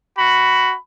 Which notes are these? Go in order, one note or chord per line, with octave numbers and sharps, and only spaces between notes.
F#4 B5